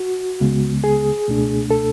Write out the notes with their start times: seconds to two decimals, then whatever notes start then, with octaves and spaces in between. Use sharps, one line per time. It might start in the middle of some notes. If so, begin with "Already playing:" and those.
Already playing: F#4
0.40 C#2 C#3 G#3 B3
0.84 G#4
1.28 C#2 B2 A3 D4
1.71 A4